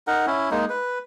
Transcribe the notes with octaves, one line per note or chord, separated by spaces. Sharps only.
D#4 A#4 F#5
C#4 E4
G#3 A#3 D#4
B4